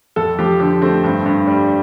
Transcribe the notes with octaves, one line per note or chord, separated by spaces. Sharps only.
F2 A4
F3 G4
D3 G4
A3 C4
G2
G2
G3